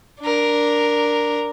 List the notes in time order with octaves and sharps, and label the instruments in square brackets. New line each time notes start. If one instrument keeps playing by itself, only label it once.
[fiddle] D4 A#4